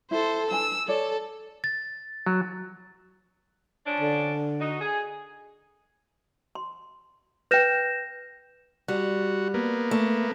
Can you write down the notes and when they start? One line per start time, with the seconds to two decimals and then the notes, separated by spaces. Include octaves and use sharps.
0.11 E4 A4 C5
0.51 D4 B4 G#5 E6
0.88 A4 C#5 D5
1.64 A6
2.26 F#3
3.87 F3 C#4 D4
4.00 D3
4.60 D#4 F#4
4.81 G#4
6.55 C6
7.51 B4 G5 G6 A#6 E7
8.88 G3 F#4
9.54 A#3 B3
9.91 A3